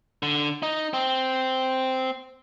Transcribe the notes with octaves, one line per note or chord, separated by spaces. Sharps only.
D3
D#4
C4